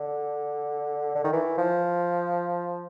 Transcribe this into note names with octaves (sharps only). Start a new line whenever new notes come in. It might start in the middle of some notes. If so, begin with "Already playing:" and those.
Already playing: D3
D3
D#3
E3
F3